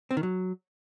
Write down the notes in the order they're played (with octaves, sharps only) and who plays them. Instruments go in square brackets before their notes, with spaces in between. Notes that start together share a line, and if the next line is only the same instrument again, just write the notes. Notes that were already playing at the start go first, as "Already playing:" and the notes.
[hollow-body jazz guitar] C4
D#3
F#3